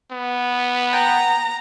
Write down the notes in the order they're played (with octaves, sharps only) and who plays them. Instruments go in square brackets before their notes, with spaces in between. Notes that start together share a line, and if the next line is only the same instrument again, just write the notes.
[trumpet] B3
[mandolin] F#5 G5 [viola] A#5